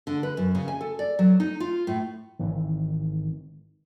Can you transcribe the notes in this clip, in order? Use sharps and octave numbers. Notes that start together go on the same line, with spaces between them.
D3
B4
F#2
C#3
G#5
A4
D5
F#3
D#4
F4
A2
G#1 D#3 E3